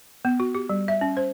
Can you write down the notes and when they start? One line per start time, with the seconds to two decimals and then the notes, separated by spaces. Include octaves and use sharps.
0.25 B3
0.40 F#4
0.55 G4
0.69 G3
0.88 E5
1.01 C#4
1.17 C5